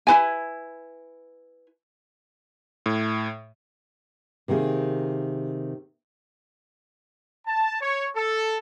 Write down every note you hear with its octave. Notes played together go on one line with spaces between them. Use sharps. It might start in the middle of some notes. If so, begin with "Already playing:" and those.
E4 B4 G#5
A2
C3 D#3 A#3 G#4
A5
C#5
A4